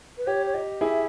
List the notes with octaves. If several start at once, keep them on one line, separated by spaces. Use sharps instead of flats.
B4
G4 C#5
C#5
G4 D#5
E4 G#4 E5